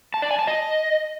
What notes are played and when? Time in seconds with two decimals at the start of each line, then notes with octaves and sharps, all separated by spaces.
0.14 A5
0.22 D5
0.31 G#5
0.39 A5
0.47 D#5